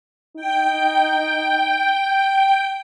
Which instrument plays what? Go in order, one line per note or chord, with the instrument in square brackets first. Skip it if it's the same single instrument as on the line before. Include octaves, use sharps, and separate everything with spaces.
[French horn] D#4 [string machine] G5